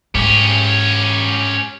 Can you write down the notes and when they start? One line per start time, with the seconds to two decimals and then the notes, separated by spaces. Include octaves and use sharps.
0.15 G#2 C#4 G4